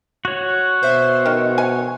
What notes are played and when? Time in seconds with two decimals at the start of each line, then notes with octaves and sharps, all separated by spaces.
0.25 F#4 C#5
0.83 B2 C5 E5
1.26 D#3
1.58 G#5